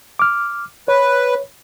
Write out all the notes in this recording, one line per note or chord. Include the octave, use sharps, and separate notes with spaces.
D6 F6
B4 C#5